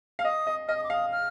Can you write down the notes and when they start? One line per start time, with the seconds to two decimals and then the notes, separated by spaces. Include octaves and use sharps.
0.19 F5 F6
0.25 D#5 D#6
0.47 D#5
0.68 D#5 F6
0.77 D#6
0.84 D6
0.90 F5 D#6
1.12 F6